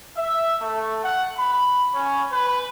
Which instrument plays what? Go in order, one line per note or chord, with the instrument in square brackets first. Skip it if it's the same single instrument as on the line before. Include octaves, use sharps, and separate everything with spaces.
[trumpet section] E5
A3
F#5
B5
C#4
B4